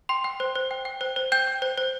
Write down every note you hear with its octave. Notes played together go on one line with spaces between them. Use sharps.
G5 C6
G5
C5
C5
G5
G5
C5
C5
G5 G6
G5
C5
C5